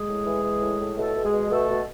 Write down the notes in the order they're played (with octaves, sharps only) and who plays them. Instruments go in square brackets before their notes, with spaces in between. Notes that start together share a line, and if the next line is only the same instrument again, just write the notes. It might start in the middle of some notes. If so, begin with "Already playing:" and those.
Already playing: [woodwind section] G#3 G#4
A2
E3
E3
A2
A2
B2 A3 A4
B2
G#3 G#4
B2
B2 A3 A4
B2